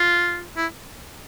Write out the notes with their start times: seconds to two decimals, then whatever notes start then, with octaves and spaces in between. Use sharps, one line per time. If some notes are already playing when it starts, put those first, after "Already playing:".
Already playing: F4
0.57 E4